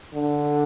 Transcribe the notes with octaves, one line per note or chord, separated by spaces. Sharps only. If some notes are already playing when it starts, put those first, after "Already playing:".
D3